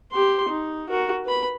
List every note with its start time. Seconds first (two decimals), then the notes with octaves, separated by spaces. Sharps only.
0.12 G4 C6
0.50 D#4
0.90 F#4 A#4
1.25 B4 B5